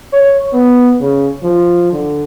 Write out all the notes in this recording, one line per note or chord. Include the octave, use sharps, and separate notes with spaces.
C#5
B3
C#3
F3
D3